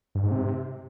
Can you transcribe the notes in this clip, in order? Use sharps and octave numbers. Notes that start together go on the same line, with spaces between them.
G2
G#2
C3